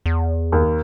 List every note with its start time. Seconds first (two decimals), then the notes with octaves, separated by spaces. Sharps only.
0.06 E2
0.52 D#2